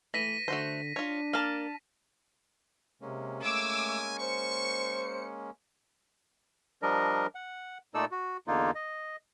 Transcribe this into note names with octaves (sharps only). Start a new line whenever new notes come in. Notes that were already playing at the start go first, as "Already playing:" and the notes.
E3 A3 A#6 B6 D#7
D3 A3 F#4 C5
D4 F4 C#5
A#3 A#4 A5 F6
C3 G#3 A#3 C#4
A3 G#5 D6 E6
C5 C#6 C#7
F3 G3 D4 A#4 D#5
F#5
A#2 A3 D#4 A4 D5 E6
F#4
E2 D3 A#3 D#4 F4
D#5